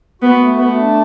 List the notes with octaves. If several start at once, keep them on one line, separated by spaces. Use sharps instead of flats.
B3 F#4
A3
A3 B3
D4